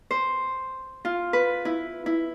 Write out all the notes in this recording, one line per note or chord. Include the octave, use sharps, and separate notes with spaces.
C5
F4
B4
E4
E4